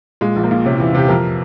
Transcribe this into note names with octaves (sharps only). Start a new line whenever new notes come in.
A#2 G#3
A#1
A#3
A#2
C3 C#4
E4
E2
C3 G4
F2 A#4